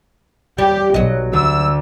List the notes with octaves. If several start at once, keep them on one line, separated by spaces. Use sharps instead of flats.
G3 G4
B1 F#3 D#5
D2 E6